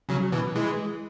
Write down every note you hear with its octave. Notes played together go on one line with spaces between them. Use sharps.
C#3 F#3
B2 E3
E3 G#3